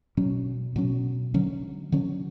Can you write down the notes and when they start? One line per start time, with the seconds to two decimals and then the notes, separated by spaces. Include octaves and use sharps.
0.17 B2 F#3 C#4
0.76 B2 F#3 C#4
1.34 D3 F#3 C#4
1.92 D3 F#3 C#4